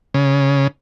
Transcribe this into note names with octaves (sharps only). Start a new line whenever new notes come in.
C#3